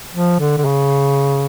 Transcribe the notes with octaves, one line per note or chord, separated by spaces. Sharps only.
F3
D3
D3
C#3